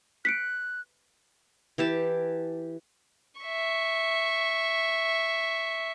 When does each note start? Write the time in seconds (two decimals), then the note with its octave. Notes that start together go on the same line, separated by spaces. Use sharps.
0.25 F#6 B6 C#7 D7
1.78 E3 G4 A5
3.41 E5 C#6